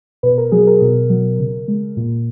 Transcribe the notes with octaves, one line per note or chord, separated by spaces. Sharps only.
B2 B4
A#4
F#3 G#4
A#4
B2 A#4
F#3
C#3
G#3
A#2